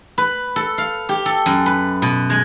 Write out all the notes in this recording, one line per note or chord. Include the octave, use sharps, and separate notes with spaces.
B4
A4
F5
G4
A4
F#2
B4
B2
G#3